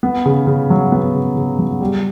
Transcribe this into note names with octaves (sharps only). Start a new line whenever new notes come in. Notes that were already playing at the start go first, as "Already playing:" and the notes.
B3
C#3
C#3
F#3
B3
C#3
C#3
F#3
G3